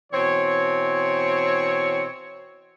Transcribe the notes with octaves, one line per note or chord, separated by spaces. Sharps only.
B2 E3 C4 C#5